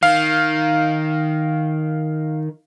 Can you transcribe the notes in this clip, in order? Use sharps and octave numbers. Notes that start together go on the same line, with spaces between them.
D#3 F5